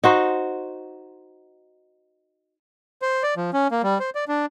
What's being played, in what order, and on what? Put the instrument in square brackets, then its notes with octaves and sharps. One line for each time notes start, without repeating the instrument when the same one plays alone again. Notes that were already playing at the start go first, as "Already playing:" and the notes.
[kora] D#4 F#4 C5
[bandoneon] C5
D5
F3
C#4
A#3
G3
C5
D5
D4